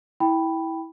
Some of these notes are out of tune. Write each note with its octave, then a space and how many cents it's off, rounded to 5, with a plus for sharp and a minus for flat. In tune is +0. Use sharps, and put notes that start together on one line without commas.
E4 -15 G5 +0 B5 +0